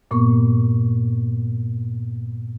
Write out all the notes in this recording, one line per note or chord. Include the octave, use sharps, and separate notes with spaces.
G2 A#2 A#3 B3 C#6